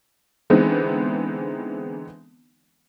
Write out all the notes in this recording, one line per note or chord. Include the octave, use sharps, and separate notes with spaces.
D3 E3 G#3 B3 C4 D#4